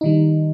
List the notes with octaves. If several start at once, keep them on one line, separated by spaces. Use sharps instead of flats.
D#3 G3 D#4